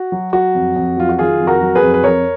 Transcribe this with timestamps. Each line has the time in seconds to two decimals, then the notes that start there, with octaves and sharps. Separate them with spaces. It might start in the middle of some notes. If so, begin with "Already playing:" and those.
Already playing: F#4
0.12 F#3
0.33 F#3 F#4
0.55 F2
0.76 F2
0.97 F#3 F4
1.09 F#4
1.18 D#3 F4 G#4
1.40 F2
1.47 F#4 A#4
1.61 F#3
1.75 G#4 B4
1.83 F2
1.94 B4
2.04 F2 A#4 C#5